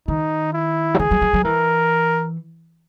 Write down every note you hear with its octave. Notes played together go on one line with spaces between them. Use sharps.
D#3 D#4
E4
F#3
E3 G#4
F#3
F#3
F#3
E3 A#4